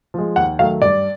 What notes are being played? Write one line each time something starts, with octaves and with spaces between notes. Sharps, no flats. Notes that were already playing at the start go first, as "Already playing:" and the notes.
F3 G#3
D#2 F#5
D#3 F#3 A3 F5
G2 D5